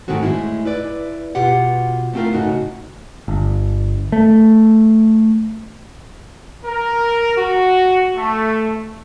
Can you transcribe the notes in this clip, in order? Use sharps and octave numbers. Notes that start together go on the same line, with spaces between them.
G#2 D#3 G#3 A3 C4 F#4
A2 G#3 E4
E4 B4 D5
B2 F4 G4 F#5
A3 B3 C4 E4 F4 A#4
A2 C#3 A3 D#4 F#4
G1
A3
A#4
F#4
A3